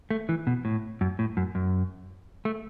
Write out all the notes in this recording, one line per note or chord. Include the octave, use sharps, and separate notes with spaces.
A3
E3
B2
A2
F#2
A2
F#2
F#2
A3